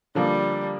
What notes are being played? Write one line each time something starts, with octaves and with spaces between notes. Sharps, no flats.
D3 F3 G3 A#3